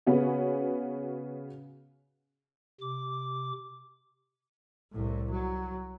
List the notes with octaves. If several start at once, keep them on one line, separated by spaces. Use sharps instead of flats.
C#3 B3 C#4 F#4
C3 D6
C2 A2
F#3